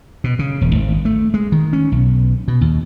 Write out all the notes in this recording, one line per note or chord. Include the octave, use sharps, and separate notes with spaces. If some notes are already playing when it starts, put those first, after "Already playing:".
B2
C#3
E1
G#1
A3
G#3
D#3
C#4
B1
B2
D#2